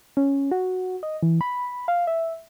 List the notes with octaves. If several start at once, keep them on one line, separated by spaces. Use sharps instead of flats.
C#4
F#4
D#5
E3
B5
F5
E5